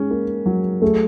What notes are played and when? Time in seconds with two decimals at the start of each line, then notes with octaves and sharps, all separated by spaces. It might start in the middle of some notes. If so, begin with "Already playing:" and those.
Already playing: G#3 C#4
0.10 A#3
0.46 F#3
0.82 A3 G#4